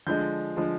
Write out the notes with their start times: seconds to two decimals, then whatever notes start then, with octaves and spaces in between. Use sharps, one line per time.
0.07 D3 F3 G#3 G6
0.57 D3 F3 G#3